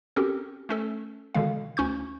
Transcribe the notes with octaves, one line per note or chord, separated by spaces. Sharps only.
C4 C#4 F#4 G4 A4 A#4
A3 C#4 A4
B2 D3 D#3 G#3 F5
D2 C#4 C#6 G6